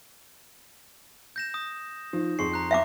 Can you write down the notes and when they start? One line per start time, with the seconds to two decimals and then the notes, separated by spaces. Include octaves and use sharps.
1.36 G6 A#6 E7
1.54 D#6
2.13 F3 D#4
2.39 F2 G#4 C6 C#6 C7
2.54 A#5 F#6
2.71 E5 F5 D6